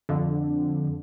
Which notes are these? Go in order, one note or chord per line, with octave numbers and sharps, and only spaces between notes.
F2 D3